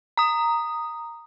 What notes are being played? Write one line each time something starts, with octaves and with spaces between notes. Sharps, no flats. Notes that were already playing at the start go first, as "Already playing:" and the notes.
A#5 D#6